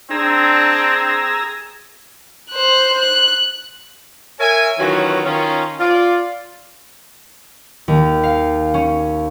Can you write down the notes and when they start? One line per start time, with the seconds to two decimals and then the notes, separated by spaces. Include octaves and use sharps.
0.11 C4 D4 G#4 A#5 E6
2.50 C5 F#6
2.98 F#6
4.40 A#4 C#5 E5 G#5
4.79 D#3 E3 F#3 C#4 F4 F#4
5.25 D#3 C#4 F4
5.80 F4 D5
7.88 D#2
8.23 F5
8.74 C#4